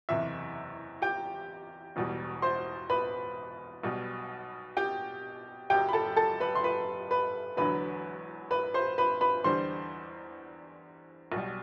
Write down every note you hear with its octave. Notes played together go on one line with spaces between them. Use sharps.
F#1 E2 C3 E5
G4 G5
E1 E2 B2 G3
C5 C6
B4 B5
B1 B2 G3
G4 G5
F#1 F#2 F#3 G4 G5
B5
A4 A5
A4 A5
B4 B5
C6
B4 B5
B4 B5
E1 E2 D3 F#3 B4 B5
B4 B5
C5 C6
B4 B5
B4 B5
E2 D3 G3 C5 C6
B1 B2 G3